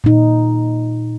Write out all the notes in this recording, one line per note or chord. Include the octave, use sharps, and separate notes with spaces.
A#2 D#4